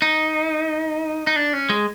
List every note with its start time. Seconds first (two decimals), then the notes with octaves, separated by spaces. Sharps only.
0.02 D#4
1.27 D#4
1.36 D4
1.53 C#4
1.69 G#3